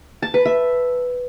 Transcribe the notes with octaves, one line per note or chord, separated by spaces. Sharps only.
A5
B4
E5